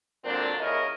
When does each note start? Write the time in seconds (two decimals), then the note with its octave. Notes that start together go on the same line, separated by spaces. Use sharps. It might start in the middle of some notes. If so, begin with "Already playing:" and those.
0.23 A#2 D3 F#3 C4 D4 A#4
0.59 D#2 C#3 C#4 E4 A#4 D#5